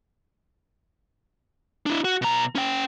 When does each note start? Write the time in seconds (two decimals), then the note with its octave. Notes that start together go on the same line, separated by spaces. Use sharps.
1.86 D4 E4
2.04 F#4
2.22 B2 A#5
2.55 C#4 G5